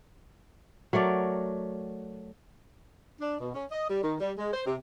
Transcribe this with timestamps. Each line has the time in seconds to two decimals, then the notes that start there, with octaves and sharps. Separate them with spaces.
0.93 F#3 A3 A#4 D5
3.20 D4
3.40 B2
3.54 C#4
3.71 D#5
3.89 G3
4.02 D#3
4.19 G3
4.37 G#3
4.53 C5
4.66 C3